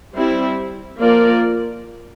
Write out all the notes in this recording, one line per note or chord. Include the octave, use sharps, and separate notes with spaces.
G3 C4 E4
F3 A#3 F4 A#4 D5